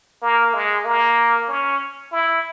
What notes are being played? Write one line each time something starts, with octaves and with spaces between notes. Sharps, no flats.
A#3
G#3
A#3
C#4
E4